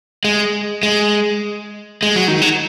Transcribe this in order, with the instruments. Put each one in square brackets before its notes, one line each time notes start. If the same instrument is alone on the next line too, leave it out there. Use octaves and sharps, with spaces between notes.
[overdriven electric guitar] G#3
G#3
G#3
F#3
D#3
F#3